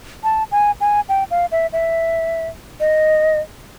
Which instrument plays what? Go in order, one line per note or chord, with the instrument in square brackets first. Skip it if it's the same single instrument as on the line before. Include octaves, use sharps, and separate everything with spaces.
[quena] A5
G#5
G#5
G5
F5
E5
E5
D#5